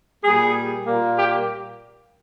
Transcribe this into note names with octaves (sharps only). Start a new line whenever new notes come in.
A#2 G3 A#3 G#4
A#2 G3 A#3
G4